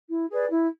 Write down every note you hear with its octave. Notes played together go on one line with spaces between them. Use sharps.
E4
G#4 B4 D5
E4